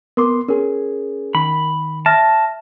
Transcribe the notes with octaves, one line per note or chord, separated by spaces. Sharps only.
B3 A#4 C6 D6
C#4 G#4 A#4
D#3 B5
E5 A5 F6 A#6